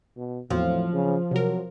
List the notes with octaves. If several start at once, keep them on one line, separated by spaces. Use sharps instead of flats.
B2
E2 A2 F3 F#3 C4
C#3
C3 F#3 A#4